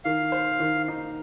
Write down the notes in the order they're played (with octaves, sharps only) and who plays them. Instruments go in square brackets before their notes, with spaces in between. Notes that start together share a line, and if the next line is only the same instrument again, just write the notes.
[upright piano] D#3 [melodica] F5
[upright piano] C5
D#3
D#4